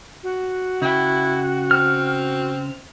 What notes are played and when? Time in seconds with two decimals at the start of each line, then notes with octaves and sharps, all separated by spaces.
0.23 F#4
0.82 C#3 E4 G5
1.71 C4 F6